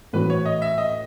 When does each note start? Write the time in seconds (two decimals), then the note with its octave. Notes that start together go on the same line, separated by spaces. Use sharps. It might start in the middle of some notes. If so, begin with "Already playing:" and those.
0.13 A2 E3 A3 C#4 F#4 B4
0.30 C#5
0.45 D#5
0.62 E5
0.78 D#5